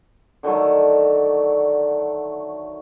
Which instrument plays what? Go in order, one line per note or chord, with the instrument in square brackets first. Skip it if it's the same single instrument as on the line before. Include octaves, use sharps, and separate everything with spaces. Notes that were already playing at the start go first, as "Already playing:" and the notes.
[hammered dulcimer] D3 D#3 F#3 A3